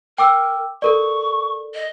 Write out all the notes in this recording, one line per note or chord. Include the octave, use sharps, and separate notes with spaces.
A#4 G5 D6 E6
A4 A#4 D5 C#6
D#5